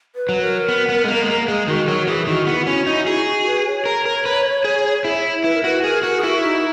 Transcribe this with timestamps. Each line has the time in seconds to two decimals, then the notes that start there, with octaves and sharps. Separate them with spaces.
0.16 B4
0.29 F#3
0.42 A#4
0.68 B3
0.89 B3
1.04 G#3
1.08 A#3
1.21 G#3
1.27 A#3
1.48 G#3 G#4
1.68 D#3 F#4
1.88 F#3 A#4
2.07 E3 G#4
2.27 D#3 F#4
2.47 B3 E4
2.67 C#4 F#4
2.87 D#4 E4
3.06 F#4 G#4
3.26 F#4
3.46 B4
3.66 C#5
3.86 A#4
4.06 A#4
4.25 B4
4.64 G#4
5.05 E4
5.44 E4 B4
5.55 A#4
5.64 F#4 B4
5.83 G#4 A#4
6.03 F#4 A#4
6.17 G#4
6.23 E4 F#4
6.43 D#4